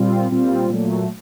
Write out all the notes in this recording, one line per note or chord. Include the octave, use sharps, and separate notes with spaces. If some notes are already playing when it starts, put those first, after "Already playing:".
Already playing: A#2 G3 C4 F4
A#2 G3 C4 F4
A#2 F#3 A3